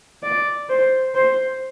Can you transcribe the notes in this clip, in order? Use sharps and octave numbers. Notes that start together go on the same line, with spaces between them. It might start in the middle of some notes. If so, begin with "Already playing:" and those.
D5
C5
C5